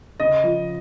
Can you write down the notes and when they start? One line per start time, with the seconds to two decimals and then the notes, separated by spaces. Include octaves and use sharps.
0.20 C#3 D#5
0.44 F3